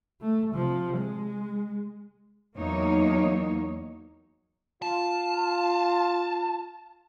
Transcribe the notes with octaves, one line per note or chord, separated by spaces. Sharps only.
A3
C3 F3
G#3
E2 F#3 A#3 D#4 C#5
F4 A5